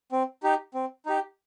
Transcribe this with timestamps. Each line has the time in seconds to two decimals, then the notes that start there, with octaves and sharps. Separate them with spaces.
0.12 C4
0.43 D#4 G4
0.74 C4
1.06 D#4 G4